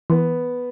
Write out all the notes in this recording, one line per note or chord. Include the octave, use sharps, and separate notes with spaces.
E3 B3